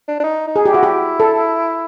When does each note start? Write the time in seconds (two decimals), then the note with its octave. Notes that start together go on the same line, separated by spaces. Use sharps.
0.08 D4
0.20 D4
0.24 D#4
0.47 D#4
0.56 G#4
0.65 G4
0.72 E4 F#4
0.83 G4
1.20 A4